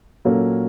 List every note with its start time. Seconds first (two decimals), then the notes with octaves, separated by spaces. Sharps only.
0.25 A#2 F#3 A#3 C#4 A4